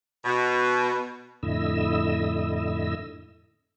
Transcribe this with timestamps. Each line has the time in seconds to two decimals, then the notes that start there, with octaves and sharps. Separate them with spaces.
0.25 B2
1.43 F2 A2 D3 E4 D#5 E6